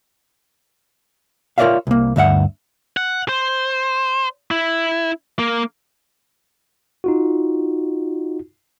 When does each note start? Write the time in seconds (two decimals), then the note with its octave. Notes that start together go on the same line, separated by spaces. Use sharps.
1.58 F4 A#4 C#5 D5 E5 F5
1.87 C2 A#3
2.16 D2 G2 E5 F#5
2.97 F#5
3.29 C5
4.51 E4
5.39 A#3
7.04 D#4 F4 F#4